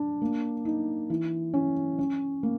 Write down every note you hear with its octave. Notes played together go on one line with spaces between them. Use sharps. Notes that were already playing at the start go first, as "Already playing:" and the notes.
Already playing: D4
A#3
D#4
E3
C#4
C#4
A#3